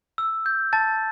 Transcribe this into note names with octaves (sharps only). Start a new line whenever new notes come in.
E6
G6
A5 A6